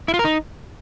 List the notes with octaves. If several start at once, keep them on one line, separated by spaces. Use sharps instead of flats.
E4
F4
A#4
D#4